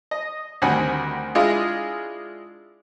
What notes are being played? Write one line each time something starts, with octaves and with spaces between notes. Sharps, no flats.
D#5
D2 D#3 G3 C4 F#5 G#5
G#3 D4 E4 F4 G#4 D#5